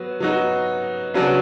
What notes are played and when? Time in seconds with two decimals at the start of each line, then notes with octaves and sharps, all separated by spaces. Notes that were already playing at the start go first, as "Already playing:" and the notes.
Already playing: F#3 B3 F#4
0.20 F#3 B3 D#4 F#4
1.14 C#3 F#3 B3 D4 F#4